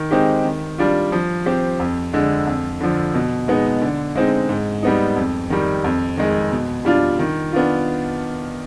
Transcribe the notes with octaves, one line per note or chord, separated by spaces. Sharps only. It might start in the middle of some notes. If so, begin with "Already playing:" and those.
Already playing: D#3
G#3 C4 D#4 G4
D#3
G3 D4 F4
F3
C4 G4
F2
D3 G#3
F2
D3 F3
B2
G#3 B3 D#4
D3
G#3 C4 D#4
G#2
G3 B3 D#4
F2
D#3 G3
F2
D#3 G#3
B2
G3 D4 F4
D#3
B3 D4 F4